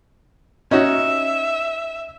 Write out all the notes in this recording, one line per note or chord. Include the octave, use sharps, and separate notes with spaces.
C#4 D#4 F#4 E5